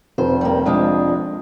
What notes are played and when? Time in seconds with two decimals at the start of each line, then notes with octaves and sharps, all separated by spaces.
0.18 F1 C5
0.41 G3 A#3
0.66 F3 G#3 D4